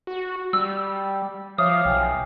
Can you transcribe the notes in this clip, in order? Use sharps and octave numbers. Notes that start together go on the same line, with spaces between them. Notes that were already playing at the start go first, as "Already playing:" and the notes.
F#4
G3 E6
F3 C#5 E5 F5 D6 D#6
B1 G5 G#5